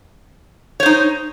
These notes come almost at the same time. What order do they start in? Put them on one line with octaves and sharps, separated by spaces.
C#5 C5 D#4